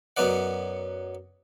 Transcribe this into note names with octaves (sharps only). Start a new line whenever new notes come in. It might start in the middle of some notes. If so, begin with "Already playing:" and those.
F#2 F#3 B3 D#4 D5 F#5